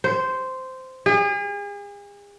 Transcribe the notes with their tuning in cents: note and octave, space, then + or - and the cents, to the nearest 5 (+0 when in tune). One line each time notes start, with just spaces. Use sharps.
C5 -10
G#4 -40